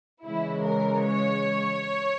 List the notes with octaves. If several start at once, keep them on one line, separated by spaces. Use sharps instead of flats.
C#3 E3 G#3 E4
A#4
C#5